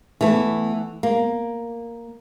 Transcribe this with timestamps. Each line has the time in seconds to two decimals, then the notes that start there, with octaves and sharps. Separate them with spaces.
0.21 E3 A3 B3
1.03 A#3